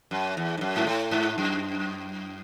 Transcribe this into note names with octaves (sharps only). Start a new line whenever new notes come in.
F#2
E2
G#2
F#2
G#2
A2
G#2
F#2